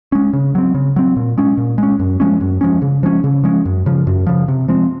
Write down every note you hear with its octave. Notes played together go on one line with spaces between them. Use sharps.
G#3 C#4
C#3
F#3 C4
C#3
F#3 C4
A#2
G#3 C#4
A#2
G#3 C#4
F#2
F3 G#3 C#4
F#2
F3 G#3 C#4
C#3
F3 G#3 C#4
C#3
F3 G#3 C#4
F#2
C#3 F3
F#2
C#3 F3
C3
F3 G#3 C4